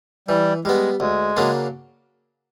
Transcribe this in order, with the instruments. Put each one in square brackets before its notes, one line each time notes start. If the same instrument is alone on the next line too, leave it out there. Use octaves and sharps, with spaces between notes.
[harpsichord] E3 [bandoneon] G3
[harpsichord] G3 B3 [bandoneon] G#3
[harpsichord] D2 [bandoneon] G#3
[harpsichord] C#3 F#3 A#3 D4